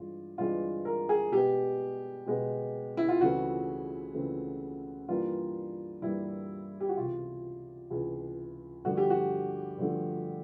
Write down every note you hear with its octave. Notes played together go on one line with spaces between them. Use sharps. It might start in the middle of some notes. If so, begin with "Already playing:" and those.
Already playing: G2 E3 G#3 C4 F4
G2 E3 G#3 C4 F4
A#4
G#4
B2 G#3 B3 G4
B2 G#3 B3
E4
F4
C#2 C#3 E3 A3 C4 F#4
C#2 C#3 E3 A3 C4
G2 E3 G3 A#3 F4
G2 E3 G3 A#3 E4
G4
F#4
C#2 C3 E3 F4
C#2 C3 E3
G2 D3 F3 A3 F#4
G4
F#4
G2 D3 F3 A3